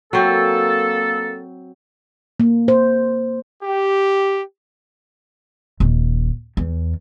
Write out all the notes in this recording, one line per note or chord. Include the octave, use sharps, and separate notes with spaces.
F#3 A#3 C4 A4
A#3
C5
G4
D#1
E2